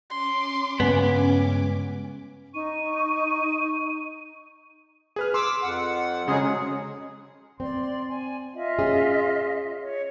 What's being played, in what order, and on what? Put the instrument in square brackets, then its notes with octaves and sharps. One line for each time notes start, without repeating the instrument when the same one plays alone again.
[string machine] C#4 D6 [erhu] C6
[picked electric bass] G2 C#3 G#3 [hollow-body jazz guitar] B3 [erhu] G#5
[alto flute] D#4 [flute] C#6 [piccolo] D#7
[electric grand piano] G#4 B4 F6
[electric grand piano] C6 [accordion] D6 E6
[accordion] F2 F#5
[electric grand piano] C#3 C#4 C6 [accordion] F#3 G#3 G#4
[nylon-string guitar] C4 [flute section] D5 C6
[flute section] G#5
F4 D#5 E5
[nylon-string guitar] C#4 G#4
[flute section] C#5